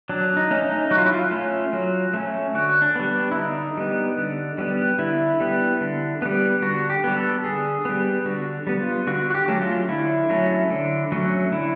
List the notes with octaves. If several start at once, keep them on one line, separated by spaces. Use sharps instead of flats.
F#3 D4
D#4
A3 C#4
D#4
F#3 F#4
F4
E4
F4
A3 C#4
F#3
A3 C#4
D3 F#4
D4
G3 B3
D4
E4
D3 D#4
G3 B3
D3
G3 B3
D3 E4
G3 B3
D3
G3 B3
D3 F#4
G4
G3 B3
A4
D3 G#4
G3 B3
D3 F#4
G3 B3
F4
D3 F#4
F#4
G4
F#3 A3 C#4
F4
D3 E4
F#3 A3 C#4
D3
F#3 A3 C#4
D3 E4